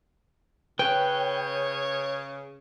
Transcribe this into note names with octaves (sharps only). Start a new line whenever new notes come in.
C#3 B4 C#5 G5 F#6